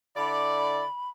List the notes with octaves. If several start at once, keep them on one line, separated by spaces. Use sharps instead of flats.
D3 E4 D5 B5